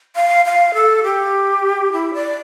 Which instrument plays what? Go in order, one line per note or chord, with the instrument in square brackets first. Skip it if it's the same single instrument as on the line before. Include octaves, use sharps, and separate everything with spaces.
[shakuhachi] F5
F5
A4
G4
E4
D5